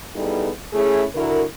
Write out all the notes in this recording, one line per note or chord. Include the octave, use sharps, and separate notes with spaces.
G3 B3 D#4 E4 G#4 A4
A3 C#4 E4 G#4
D3 E4 F#4 A#4